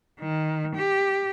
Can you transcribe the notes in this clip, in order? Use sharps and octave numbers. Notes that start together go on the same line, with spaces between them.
D#3
G4